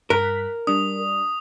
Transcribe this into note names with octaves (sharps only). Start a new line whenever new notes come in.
G2 A#4 F#6 B6
G3 D4 D#6